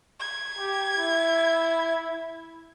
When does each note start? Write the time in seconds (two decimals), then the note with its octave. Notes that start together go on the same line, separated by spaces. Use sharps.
0.20 G#6
0.59 G4
0.98 E4